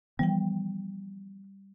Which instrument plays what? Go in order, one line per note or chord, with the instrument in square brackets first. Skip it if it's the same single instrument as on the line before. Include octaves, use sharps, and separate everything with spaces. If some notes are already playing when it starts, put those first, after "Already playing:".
[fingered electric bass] E3 F3 B3 [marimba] G3 G5